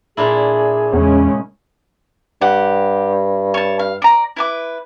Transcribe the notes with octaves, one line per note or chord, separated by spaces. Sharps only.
A#2 D4 E4 G#4
E2 C#3 G#3 C#4
G2 G4 F#5
C#5 A5
F5
D5 A#5
E4 B4 D6